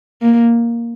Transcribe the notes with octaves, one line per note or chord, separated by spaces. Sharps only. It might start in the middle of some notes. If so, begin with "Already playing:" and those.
A#3